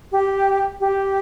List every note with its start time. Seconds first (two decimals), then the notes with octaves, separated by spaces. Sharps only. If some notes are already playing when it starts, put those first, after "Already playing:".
0.12 G4
0.81 G4